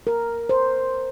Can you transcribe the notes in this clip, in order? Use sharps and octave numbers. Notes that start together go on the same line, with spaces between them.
A#4
C5